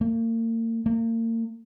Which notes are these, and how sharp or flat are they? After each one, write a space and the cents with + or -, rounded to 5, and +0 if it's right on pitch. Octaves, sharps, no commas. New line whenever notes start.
A#3 -40
A#3 -40